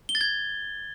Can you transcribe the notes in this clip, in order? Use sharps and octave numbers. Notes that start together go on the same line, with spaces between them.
G7
A6
G#6